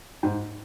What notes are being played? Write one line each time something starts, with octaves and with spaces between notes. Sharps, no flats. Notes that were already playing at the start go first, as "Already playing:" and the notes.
G#2